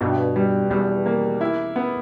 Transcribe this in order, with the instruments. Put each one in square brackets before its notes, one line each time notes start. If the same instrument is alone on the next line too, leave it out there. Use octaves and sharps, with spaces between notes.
[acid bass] G2 [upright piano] B2
[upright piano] G3
[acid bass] E2 [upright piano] G3
[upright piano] A#3
E4
B3